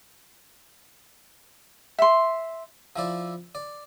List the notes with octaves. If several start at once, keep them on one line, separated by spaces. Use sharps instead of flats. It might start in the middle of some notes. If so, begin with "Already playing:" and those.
E5 C6
F3 E4 D5
D5